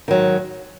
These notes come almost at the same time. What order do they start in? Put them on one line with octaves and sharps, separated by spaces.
D#3 F#3 G#2